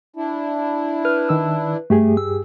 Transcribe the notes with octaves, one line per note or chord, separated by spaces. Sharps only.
D4 E4
B4 F6
D#3 E6
G2 A3 G4 G#4
E6